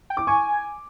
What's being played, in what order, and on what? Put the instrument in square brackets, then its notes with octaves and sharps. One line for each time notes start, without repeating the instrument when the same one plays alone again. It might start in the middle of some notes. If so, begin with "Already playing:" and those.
[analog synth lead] G5
[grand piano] D6
[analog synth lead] G#5 [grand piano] C#6